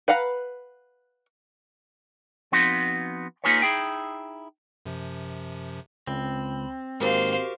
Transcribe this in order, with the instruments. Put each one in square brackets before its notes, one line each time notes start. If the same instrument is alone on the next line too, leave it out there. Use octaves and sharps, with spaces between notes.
[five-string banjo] B4 F5 F#5 A#5 B5
[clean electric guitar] F3 B3 C4 D#4 F#4
A#3 D#4 F4 G#4 B4 C#5
D#4 E4 G#4 G5
[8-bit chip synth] F#2 C3 F3
[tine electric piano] C#2 [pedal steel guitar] C4 [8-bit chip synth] B5
[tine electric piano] G#2 D#3 A#3 [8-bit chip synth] F#4 G4 A#4 [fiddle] C5 F5